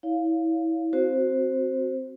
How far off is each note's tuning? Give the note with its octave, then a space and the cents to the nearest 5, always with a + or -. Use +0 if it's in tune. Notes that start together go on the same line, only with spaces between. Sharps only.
E4 -25 C#5 +35 F5 +0
C4 +0 F#4 +0 C5 +5